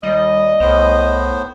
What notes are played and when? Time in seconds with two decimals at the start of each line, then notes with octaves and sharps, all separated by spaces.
0.03 D#2 G3 D#5
0.60 C2 A2 B3 C5